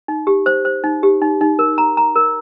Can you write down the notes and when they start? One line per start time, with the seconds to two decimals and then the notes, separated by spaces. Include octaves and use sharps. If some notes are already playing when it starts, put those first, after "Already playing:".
0.08 D#4
0.27 G4
0.46 C5
0.65 C5
0.84 D#4
1.03 G4
1.22 D#4
1.41 D#4
1.59 A#4
1.78 A#5
1.97 A#5
2.16 A#4